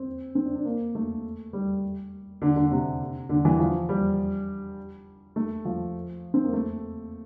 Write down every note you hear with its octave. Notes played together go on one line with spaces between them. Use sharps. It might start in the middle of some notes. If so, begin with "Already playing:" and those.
Already playing: C4
C4
D4
D4
A#3
A3
G3
D3
D3
C3
D3
E3
F3
G3
A3
F3
C4
A#3
A3